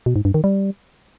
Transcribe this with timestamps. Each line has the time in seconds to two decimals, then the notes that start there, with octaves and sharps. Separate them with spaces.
0.06 B2
0.16 G#2
0.25 G2
0.34 D#3
0.44 G3